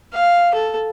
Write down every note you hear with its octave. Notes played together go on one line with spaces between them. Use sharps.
F5
A4